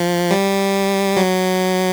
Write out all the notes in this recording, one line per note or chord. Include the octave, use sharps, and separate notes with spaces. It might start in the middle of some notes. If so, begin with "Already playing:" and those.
Already playing: F3
G3
F#3